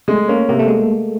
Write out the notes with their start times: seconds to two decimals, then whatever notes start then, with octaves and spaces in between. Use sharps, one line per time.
0.08 G#3 A3
0.28 A#3 C#4
0.49 C3 A#3
0.59 A3
0.68 G#3